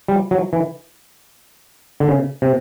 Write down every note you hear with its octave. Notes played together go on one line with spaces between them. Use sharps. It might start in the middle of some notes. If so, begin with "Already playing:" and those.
G3
F#3
E3
D3
C#3
C3